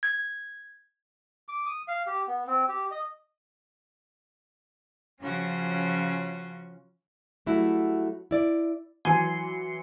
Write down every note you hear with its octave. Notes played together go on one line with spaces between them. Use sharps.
G#6
D6
D#6
F5
G4
B3
C4
G4
D#5
C#3 F3 C#4 F4 F#4
F#3 G3 A3 E4 F#4
E4 D5
E3 F#3 G#5 C6 C#7